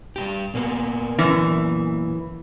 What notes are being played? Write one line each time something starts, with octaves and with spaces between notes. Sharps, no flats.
G2 A#2 G4
A#2 A#3 B3
F#2 E3